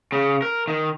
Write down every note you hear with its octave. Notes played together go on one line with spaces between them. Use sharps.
C#3
A#4
D#3